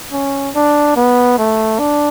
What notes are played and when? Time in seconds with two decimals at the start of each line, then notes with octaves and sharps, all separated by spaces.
0.12 C#4
0.55 D4
0.96 B3
1.38 A3
1.79 D4